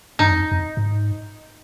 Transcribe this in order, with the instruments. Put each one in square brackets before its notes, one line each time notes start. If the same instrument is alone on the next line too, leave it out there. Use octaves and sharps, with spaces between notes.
[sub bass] G2 [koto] D#4
[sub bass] F2
F2
G#2